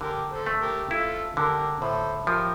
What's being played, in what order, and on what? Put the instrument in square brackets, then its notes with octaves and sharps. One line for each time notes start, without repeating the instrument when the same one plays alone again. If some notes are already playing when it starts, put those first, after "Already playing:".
[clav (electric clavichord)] D3 [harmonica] G4 A#4
[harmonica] A4 C5
[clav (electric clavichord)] A3
[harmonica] G4 A#4
[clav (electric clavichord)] E4 [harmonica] F4 A4
[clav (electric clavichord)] D3 [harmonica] G4 A#4
[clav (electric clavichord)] A2 [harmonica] A4 C5
[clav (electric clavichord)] F3 [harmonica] G4 A#4